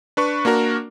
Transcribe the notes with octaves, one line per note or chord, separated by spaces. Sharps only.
D4 B4 C#6
A#3 D4 F#4 A#4